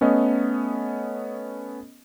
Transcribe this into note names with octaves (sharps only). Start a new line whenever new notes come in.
A3 B3 C#4 A4 D#5